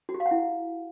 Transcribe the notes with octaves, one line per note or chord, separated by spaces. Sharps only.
F#4
G4
F5
F#5
E4